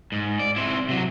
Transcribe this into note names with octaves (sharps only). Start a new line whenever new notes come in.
G#2
D5
C4 E4
C3 F#3